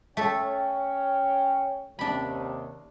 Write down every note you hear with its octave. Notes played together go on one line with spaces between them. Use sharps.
A3 C#4 A4 C#5 G5
D#2 C3 D4 B5